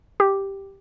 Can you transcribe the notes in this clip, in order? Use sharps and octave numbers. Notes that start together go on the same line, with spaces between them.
G4